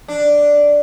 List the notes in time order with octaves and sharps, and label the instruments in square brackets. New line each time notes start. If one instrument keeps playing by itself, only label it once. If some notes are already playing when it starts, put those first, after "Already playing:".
[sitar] D4